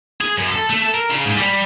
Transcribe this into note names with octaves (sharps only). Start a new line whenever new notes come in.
G#4
F#2
A4
A3
A4
A#4
C#3
G#2
G3